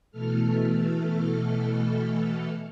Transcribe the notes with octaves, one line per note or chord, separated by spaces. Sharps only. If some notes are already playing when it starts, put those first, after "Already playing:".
B2 E3 A3 A4 F6